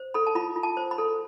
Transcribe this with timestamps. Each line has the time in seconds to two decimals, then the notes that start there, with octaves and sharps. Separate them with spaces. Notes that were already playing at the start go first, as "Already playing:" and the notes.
Already playing: C5
0.14 A4 B5
0.27 A5
0.35 F4 B5
0.56 F4
0.63 A5
0.77 C5
0.91 B5
0.98 A4